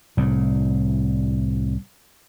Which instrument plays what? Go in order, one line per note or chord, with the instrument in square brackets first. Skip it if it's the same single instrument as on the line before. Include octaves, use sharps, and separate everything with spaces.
[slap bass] C2 A2